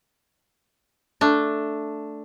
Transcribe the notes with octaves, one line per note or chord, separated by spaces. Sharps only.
A3 D4